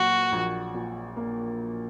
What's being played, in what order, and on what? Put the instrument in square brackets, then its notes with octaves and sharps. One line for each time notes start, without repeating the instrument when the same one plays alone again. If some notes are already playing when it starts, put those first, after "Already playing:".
Already playing: [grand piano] A#2 F#3 A#3 [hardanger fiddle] F#4
[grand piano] A#1
A#2
A#3